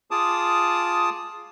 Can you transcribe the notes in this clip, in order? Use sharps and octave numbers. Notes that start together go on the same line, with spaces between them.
F4 G#4 A5 D6 D#6